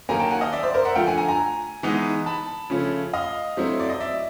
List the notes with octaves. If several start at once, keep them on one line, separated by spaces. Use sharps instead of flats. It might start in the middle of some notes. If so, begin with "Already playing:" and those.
D#3 F#3 A#3 G#5 A#5
G5 A5
F#5 G#5
D#5 F5
D5 E5
C5 D5
A#4 C5
E5 F#5
D3 F3 A3 F5 G5
F#5 G#5
G#5 A#5
G#5 A#5
E3 G#3 B3 D#4
A5 B5
C#3 F3 A3 C#4
D#5 F5
F#3 A3 C4 E4
D5
D#5
D5 E5